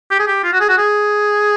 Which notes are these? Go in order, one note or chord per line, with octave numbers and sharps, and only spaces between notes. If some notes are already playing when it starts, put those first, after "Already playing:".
G4
G#4
G4
F4
F#4
G#4
F#4
G#4